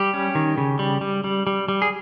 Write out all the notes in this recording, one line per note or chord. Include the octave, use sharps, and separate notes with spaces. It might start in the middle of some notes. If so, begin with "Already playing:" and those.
Already playing: G3 G4
C#4
D#3
C#3
G3
G3
G3
G3
G3
G#4